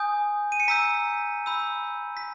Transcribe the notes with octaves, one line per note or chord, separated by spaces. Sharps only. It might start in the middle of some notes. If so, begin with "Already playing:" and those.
Already playing: G#5 D#6 G6
D#7
C#7
A#5 E6 G6 B6
B5 E6 G6
B6